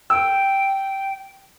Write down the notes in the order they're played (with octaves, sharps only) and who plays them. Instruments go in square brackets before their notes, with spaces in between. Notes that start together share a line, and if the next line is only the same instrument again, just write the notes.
[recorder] G5 [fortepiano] E6